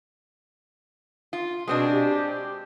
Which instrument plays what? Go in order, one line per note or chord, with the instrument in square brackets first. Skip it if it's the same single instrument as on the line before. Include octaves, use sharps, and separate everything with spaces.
[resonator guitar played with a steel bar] F4
[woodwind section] B2 [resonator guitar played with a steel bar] G#3 C4 D4
[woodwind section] G4